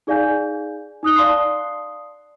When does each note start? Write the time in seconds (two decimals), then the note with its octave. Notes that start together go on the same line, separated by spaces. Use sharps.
0.07 D#4 G#4 D5 F5 G#5 G6
1.03 D#4 D#6 F#6 G7
1.16 D5 F5 A5 C6 D#6 C7